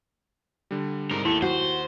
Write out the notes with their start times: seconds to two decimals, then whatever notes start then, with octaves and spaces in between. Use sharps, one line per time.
0.71 D3 G3
1.11 C2 G#2 A#4
1.25 D#2 A3 E4
1.42 F#4 C5